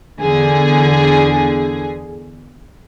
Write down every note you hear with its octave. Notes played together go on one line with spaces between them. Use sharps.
E2 D3 G#4